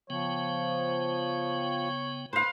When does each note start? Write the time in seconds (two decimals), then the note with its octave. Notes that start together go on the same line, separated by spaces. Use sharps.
0.10 C#3 F3 B3 C#5 G5
2.33 G#2 A3 D#4 B4 C5 F5